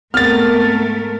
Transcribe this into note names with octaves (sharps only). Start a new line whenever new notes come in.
G#2 A3 B3 C4 A#4 F6 A6